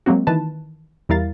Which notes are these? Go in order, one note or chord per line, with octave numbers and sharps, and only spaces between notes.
F#3 G#3 A#3 C4 F#4
D#3 E3 B4 A5
E2 G3 E4 A#4 F5 A6